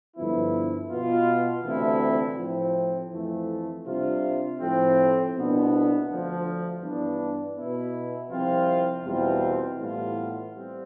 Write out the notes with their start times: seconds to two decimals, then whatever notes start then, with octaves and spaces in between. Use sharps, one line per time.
0.16 G2 D3 F3 B3 E4
0.91 B2 B3 F4
1.64 D2 C3 E3 A3 E4
2.38 A2 F3 C4
3.13 F2 E3 A3
3.86 C3 G3 D4 F4
4.61 A2 F3 A3 C4
5.34 C2 B2 B3 D4
6.09 D2 D3 F3
6.82 G2 E3 B3 D4
7.57 B2 B3 E4
8.31 C2 C3 F3 C4 F4
9.04 E2 B2 G3 C4 F4
9.79 A2 E3 G3 B3 F4
10.52 G3 C4